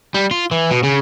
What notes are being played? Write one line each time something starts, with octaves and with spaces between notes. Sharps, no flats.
G3
F4
E3
B2
C#3